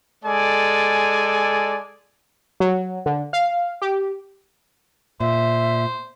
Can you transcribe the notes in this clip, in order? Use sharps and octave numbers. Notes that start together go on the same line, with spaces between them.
G#3 A4 D5 G#5
F#3
D3
F5
G4
A#2 C5 E5